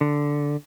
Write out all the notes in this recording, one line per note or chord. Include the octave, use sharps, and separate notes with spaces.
D3